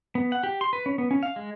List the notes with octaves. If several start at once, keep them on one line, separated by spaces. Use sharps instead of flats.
B3
F#5
G4
C6
B4
C#4
B3
C#4
F5
G#3